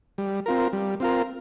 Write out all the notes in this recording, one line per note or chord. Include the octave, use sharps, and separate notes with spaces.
G3
C4 F4 A#4
G3
C4 F4 A#4